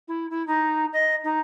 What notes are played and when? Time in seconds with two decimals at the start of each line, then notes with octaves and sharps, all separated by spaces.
0.08 E4
0.30 E4
0.47 D#4
0.93 D#5
1.24 D#4